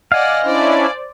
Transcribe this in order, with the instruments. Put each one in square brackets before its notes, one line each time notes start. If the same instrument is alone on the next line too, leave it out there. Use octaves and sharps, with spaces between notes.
[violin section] D5 F#5 [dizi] D#5 [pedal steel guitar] F5 G#5
[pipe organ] C#4 D4 E4 [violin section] C5 D5